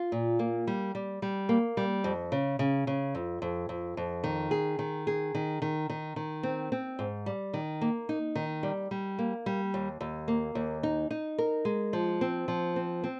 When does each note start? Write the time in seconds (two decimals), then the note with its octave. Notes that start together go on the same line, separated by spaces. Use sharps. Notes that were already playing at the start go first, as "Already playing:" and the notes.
Already playing: F4
0.12 A#2
0.39 A#3
0.67 G3
0.95 G3
1.22 G3
1.49 A#3
1.77 G3
2.04 F2
2.32 C#3
2.59 C#3
2.87 C#3
3.15 F2
3.42 F2
3.69 F2
3.97 F2
4.24 D#3
4.51 G#4
4.79 D#3
5.07 G#4
5.35 D#3
5.62 D#3
5.90 D#3
6.16 D#3
6.43 C4
6.72 C4
6.99 G#2
7.26 G3
7.54 D#3
7.81 A#3
8.09 D#4
8.35 D#3
8.63 G3
8.91 G3
9.19 A#3
9.46 G3
9.74 D#2
10.01 D#2
10.28 A#3
10.55 D#2
10.83 D#4
11.11 D#4
11.38 A#4
11.65 G#3
11.93 F3
12.21 C4
12.48 F3
12.76 C4
13.04 C4